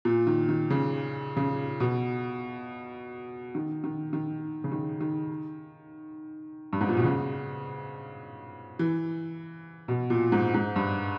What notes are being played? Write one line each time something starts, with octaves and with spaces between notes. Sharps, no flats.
A#2
D#3
D#3
C#3
C#3
B2
D#3
D#3
D#3
C#3
D#3
D#3
G2
G#2
A#2
B2
C#3
E3
B2
A#2
G#2
G#2
G2